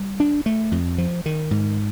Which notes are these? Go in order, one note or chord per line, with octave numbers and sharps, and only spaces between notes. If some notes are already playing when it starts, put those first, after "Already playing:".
Already playing: G3
D4
A3
F2
F3
D#3
G#2